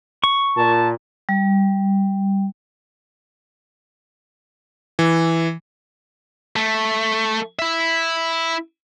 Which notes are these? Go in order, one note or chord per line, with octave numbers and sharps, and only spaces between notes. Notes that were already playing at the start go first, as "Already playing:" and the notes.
C#6
A#2 A5
G3
E3
A3
E4 E5